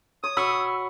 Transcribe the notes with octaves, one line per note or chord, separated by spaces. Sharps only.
C#5 D#6
F#4 C#5 B5 C#6 E6